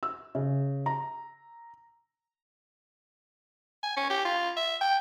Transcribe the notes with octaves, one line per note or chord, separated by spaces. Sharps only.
E6
C#3
A#5
G#5
C#4
G4
F4
E5
G5